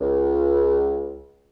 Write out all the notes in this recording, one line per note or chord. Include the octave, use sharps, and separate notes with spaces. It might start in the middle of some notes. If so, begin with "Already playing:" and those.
C#2